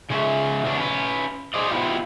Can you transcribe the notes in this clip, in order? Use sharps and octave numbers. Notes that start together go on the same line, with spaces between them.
C#3 G#3 C#4 G#4 E5
C#3 E3 B3 C#4 D4
C#4 B4
G#4 C5 D5 D#5
B3 E4 F4 G4